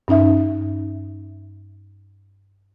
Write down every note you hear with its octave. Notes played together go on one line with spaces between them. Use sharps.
G2 C#4 D#4 E5